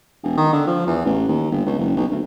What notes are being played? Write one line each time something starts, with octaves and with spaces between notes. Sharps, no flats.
E1
D#3
D3
F3
E2
A1
D#2
G1
C#2
F#1
B1
D2